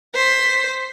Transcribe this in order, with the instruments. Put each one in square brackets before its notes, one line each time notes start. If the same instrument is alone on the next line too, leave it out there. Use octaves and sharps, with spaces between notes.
[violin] C5 B6